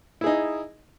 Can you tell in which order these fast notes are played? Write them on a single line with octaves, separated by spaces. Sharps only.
E4 G#4 D#4